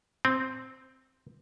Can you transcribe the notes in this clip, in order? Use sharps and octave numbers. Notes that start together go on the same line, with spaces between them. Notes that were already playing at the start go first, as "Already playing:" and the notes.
C4